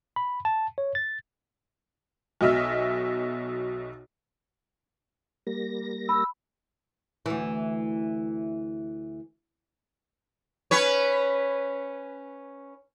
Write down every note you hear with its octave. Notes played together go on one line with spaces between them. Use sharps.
B5
A5
C#5
A6
B1 B2 D#5 E5 F6
G3 A#3 A#6
B5 E6
D2 E3
C#4 B4 C#5